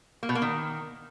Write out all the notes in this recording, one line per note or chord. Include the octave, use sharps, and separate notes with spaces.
A#3
B2
A#3
D#3